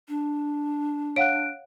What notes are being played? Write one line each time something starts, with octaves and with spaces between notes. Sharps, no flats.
D4
C#5 F5 F#5 F#6 D7